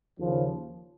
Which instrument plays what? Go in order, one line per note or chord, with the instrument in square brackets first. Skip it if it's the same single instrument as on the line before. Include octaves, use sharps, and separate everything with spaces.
[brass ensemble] D#2 C#3 F3